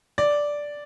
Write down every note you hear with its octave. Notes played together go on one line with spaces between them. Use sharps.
D5